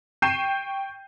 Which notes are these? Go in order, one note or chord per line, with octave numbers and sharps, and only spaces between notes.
G5 C#6 G6 C7 D#7 E7